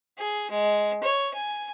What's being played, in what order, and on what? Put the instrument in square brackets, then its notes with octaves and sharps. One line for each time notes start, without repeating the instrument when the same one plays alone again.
[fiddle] G#4
G#3
C#5
G#5